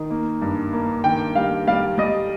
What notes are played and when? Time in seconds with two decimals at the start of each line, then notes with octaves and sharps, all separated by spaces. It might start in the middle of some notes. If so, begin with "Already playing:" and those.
Already playing: D#3 D#4
0.10 A#3
0.42 G2
0.73 A#3
1.04 D#3 G5
1.35 G3 F5
1.67 G3 F5
1.98 G3 D#5